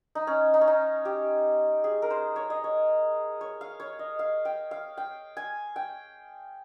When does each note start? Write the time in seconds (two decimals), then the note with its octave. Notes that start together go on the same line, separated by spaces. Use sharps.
0.15 D#4
0.27 C#4
0.54 D#4
0.61 C#4
0.68 D#4
1.05 G4
1.84 G#4
2.02 A#4
2.10 C5
2.36 C#5
2.50 D#5
2.64 C#5
3.41 C#5
3.61 F5
3.80 C#5
3.99 D#5
4.19 F5
4.45 G5
4.71 F5
4.97 G5
5.37 G#5
5.76 G5